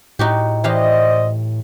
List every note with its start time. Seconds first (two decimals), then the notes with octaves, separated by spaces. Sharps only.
0.19 A2 D#4 F#4 G4
0.64 E3 G4 C5 D5 D#5 F5